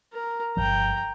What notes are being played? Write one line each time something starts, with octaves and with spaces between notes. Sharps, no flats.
A#4
G1 C#2 F3 G5 A#5